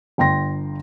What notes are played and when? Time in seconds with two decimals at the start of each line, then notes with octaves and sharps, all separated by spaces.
0.18 G1 G5 C6 A#6